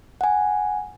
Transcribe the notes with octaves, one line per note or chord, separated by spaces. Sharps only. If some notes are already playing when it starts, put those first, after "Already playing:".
F#5 G#5